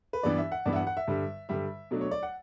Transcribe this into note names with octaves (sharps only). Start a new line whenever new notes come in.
B4
G2 E3 B3 D4 D5
E5
F#5
G2 E3 B3 D4 D5
E5
F#5
F#5
E5
G2 D3 G3
G2 D3 G3 E5
B2 F#3 A3 D4
C#5
D5
F#5